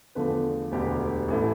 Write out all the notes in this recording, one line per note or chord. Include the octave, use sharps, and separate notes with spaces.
E2 D3 F3 A3 B4
E1 D2 D3 G4
A1 E3 A3